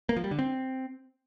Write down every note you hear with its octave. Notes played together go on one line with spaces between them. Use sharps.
A#3
F3
G3
D3
C4